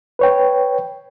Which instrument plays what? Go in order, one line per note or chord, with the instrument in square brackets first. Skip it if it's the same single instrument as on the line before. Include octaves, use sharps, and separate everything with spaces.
[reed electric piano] B4 C#5 G5